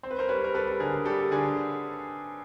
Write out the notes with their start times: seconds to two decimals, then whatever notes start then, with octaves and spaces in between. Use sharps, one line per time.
0.03 C4 C5
0.11 B4
0.19 A#4 C5
0.29 G3 B4 C#5
0.44 A#4
0.54 G3 A4 B4
0.80 D3 G#4 A#4
1.05 G3 G4 A4
1.31 D3 G#4